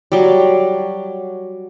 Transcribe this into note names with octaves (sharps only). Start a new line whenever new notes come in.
F#3 G3